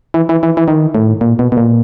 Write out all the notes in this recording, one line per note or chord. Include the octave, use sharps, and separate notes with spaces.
E3
E3
E3
E3
D#3
A2
A#2
B2
B2
A#2